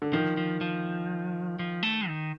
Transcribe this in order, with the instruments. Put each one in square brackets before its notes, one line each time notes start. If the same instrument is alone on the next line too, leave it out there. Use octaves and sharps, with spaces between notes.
[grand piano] D3
[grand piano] D#3 [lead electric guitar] F3
[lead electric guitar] F3
F3
F3
A3
D#3